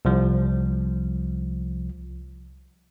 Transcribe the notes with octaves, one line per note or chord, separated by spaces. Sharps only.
C2 F3